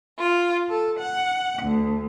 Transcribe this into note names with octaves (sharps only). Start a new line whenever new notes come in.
F4
A4
F#5
D2